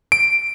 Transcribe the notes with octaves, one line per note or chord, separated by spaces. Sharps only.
D7